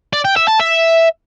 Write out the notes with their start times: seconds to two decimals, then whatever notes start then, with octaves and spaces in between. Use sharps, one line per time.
0.13 D5
0.25 G5
0.36 E5
0.48 A5
0.59 E5